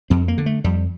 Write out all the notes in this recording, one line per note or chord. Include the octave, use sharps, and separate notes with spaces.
F2 C4
A#3
D3
A3
F2 G3